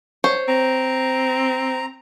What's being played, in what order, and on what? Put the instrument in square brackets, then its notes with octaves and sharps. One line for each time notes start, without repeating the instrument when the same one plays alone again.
[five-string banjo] C5 C#5
[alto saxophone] C4 [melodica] A#5